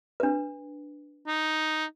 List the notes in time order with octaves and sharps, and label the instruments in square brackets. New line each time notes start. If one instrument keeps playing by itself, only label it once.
[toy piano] D4 B4
[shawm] D#4